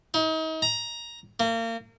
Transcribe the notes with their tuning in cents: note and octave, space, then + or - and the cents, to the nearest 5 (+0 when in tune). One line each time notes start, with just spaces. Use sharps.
D#4 +35
A#5 +10
A#3 -35